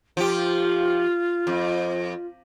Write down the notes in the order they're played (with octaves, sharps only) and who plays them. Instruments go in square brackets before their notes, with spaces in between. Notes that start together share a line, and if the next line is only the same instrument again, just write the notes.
[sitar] F3 G4 [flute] F4
[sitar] F2